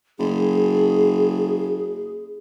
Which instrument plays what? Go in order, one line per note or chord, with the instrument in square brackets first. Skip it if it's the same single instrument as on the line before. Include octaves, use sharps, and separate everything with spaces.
[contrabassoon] F#1 [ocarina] G#4